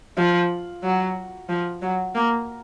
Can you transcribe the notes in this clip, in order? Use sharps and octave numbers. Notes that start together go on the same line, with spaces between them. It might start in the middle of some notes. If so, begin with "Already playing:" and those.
F3
F#3
F3
F#3
A#3